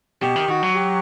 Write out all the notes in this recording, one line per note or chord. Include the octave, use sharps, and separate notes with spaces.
B2 G4
D#3
D#3 F#4
F#3
G4